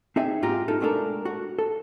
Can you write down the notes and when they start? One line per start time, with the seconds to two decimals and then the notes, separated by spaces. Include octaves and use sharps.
0.16 C4 D#4 G#4 E5 G#5
0.42 G#2 F4 G4 A#5
0.68 D#4 F4 A4
0.80 G#3 A3 B3 D4 A4 A#4
1.25 F#4
1.59 A4